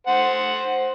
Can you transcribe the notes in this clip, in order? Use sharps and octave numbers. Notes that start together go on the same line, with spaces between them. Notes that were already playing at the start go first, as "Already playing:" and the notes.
C5 F#5